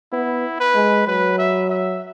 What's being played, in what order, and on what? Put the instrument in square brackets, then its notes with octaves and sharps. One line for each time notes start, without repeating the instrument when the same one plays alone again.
[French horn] B3 [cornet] E4
[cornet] B4
[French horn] G#3
[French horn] F#3 [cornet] B4
[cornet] E5
E5